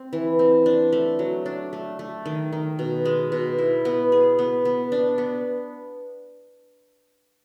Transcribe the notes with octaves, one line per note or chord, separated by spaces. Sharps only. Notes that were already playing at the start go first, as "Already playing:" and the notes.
Already playing: C4
E3
C4
D4
A3
F#3
D4
A3
A3
D#3
D#3
B2
G#3
B2
E4
B3
G#4
B3
B3
D4
B3